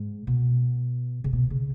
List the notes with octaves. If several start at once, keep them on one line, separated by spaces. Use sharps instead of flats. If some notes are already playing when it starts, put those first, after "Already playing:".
Already playing: G#2
B2
C#3
B2
C#3